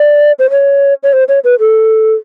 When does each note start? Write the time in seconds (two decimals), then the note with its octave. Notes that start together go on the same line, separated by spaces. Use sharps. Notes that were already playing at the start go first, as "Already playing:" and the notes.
Already playing: D5
0.39 C5
0.50 C#5
1.03 C#5
1.13 C5
1.28 C#5
1.44 B4
1.59 A4